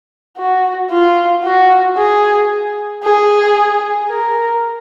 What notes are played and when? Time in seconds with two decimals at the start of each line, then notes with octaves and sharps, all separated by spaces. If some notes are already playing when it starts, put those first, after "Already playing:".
0.38 F#4
0.91 F4
1.44 F#4
1.97 G#4
3.04 G#4
4.10 A#4